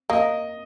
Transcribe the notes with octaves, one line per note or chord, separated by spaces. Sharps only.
A#3 D#5